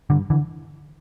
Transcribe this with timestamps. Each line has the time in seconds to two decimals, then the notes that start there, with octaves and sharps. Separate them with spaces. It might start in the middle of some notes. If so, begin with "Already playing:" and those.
0.10 G2 D3
0.30 D3 E3